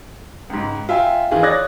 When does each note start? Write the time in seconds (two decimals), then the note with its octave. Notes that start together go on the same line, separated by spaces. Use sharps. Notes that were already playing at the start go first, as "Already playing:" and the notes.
0.50 C#2 G#2
0.89 F4 E5 G5 G#5
1.31 D#3 E3 F4 G#4
1.43 C#5 D5 D#6 F#6 G#6 A#6